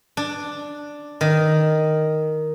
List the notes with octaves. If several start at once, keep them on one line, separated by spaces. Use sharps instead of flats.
D4
D#3